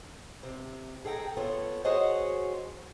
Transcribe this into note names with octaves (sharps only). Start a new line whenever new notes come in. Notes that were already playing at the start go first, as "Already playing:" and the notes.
C3
G#4 A4 G5 A#5
B3 F4 A4 C#5
F#4 G#4 C5 C#5 D#5 F#5